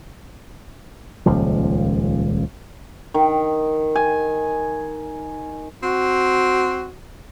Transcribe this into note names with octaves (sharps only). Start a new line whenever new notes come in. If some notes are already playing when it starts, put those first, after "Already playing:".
D#1 C#2 F3
D#3
G#5
C4 F#4